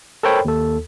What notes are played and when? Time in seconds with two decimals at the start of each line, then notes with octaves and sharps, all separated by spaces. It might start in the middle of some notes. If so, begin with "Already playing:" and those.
0.23 A4 A#4 C5 C#5 G5 B5
0.45 D#2 A4